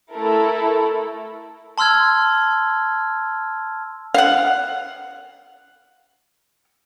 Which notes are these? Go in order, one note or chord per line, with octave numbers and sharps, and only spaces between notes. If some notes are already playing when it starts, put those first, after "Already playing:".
A3 E4 A4 A#4
A5 C6 E6 F6 G#6
F5 F#5